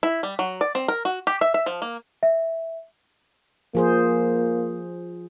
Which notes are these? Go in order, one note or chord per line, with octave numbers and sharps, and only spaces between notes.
E4
G3
F#3
D5
C4
A#4
F#4
G4
E5
E5
F3
A#3
E5
F3 A#3 G#4 C5